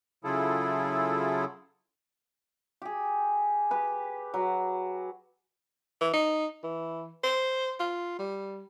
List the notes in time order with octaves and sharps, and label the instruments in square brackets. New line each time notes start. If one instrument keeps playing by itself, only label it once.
[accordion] C#3 F#3 E4 F4 G#4 A4
[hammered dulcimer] G4 G#4
G4 B4
F#3
[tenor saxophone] E3
D#4
E3
C5
F4
G3